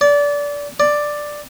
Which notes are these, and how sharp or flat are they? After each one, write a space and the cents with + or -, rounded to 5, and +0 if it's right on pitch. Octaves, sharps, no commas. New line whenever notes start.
D5 -25
D5 +5